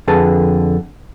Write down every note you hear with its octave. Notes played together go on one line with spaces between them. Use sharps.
F2 D3 G#4 B4 A5